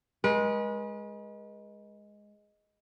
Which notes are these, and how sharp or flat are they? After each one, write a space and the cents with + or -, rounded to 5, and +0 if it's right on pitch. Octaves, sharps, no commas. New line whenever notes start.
G#3 +0 B4 -40